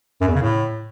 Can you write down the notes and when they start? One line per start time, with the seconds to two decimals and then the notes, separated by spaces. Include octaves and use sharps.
0.21 F#2
0.28 E2
0.35 C#3
0.42 A2